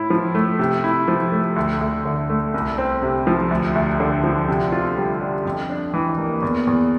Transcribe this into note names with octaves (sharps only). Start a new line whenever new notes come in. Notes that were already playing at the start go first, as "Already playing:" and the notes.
Already playing: A2 E4
F3
A3
C3
E4
F3
A3
D2
D2
D3
A3
C2
C4
C3
F3
D2
D2
D3
F3
C3
F4
G3
D4
F2
D4
E3
A#3
E2
E2